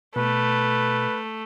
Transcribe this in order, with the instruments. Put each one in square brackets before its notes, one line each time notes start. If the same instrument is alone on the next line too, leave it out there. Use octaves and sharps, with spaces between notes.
[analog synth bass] B2 [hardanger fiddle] A3 [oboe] B4